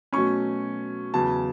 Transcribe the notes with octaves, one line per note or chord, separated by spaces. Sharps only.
B2 F#3 A3 C#4 C#6
E2 C#3 F#3 A5